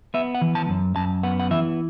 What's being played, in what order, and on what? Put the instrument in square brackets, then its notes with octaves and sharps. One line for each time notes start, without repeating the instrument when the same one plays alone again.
[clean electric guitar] B3 E5
F#5
E3
A5
F#2
F#2 A5
B3 F#5
F#5
E3 E5